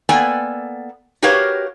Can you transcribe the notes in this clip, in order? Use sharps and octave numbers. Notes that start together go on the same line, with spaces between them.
A#3 B3 A4 D5 G5 G#5
F#4 G4 A#4 B4 C#5 F5